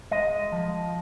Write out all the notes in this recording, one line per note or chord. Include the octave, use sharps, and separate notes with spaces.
G#3 D#5
F3